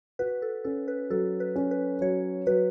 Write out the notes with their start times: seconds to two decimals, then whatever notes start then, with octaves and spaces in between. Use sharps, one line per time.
0.19 F#4 B4
0.42 A4
0.64 C#4 A4
0.88 B4
1.10 F#3 A4
1.40 B4
1.56 C#4
1.71 B4
2.01 F#3 C#5
2.47 F#3 B4